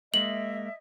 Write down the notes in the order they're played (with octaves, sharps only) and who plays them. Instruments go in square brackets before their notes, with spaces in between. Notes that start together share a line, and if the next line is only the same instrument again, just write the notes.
[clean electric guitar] G#3 A#3 [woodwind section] D#5 E5 [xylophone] F#7